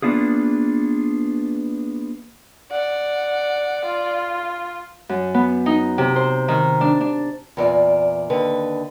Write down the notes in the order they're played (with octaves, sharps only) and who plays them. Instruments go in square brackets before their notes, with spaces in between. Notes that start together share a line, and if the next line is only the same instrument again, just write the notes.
[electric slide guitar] A#3 B3 D4 F4 G#4
[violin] D5 [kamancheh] F#5
[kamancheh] F4
[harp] F#2
B3
D#4
C3
C5
D#3
D4
D4
[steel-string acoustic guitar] E2 A#2 D5
D#2 D3 B4